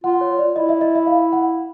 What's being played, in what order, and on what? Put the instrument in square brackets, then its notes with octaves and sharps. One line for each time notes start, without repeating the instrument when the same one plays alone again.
[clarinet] F4 [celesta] F#5
[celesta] C#5
D5
[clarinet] E4 [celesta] D#5
[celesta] E5
D#5
E5
F5
F#5